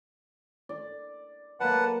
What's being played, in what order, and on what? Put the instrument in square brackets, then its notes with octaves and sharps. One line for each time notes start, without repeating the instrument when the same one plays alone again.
[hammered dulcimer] D5
[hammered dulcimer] F#3 A#3 [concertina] B4 F#5 A5